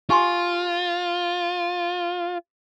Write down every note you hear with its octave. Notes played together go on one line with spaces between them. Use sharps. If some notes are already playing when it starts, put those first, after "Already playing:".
F4 G4 G#5 C6